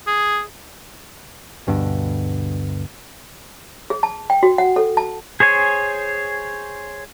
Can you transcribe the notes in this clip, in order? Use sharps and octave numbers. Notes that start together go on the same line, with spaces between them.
G#4
D2 G2 B2 D3
G#4
A5
G5
F#4
F#5
A4
A5
G#4 C5 C#5 G#5